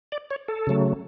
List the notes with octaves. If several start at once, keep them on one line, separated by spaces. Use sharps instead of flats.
D5
C#5
A4
C#3 F#3 A3